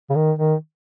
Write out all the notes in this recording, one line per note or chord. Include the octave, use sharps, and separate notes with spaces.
C#3
D#3
D#3